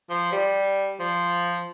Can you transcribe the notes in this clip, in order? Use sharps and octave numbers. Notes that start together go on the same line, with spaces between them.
F3
G3
F3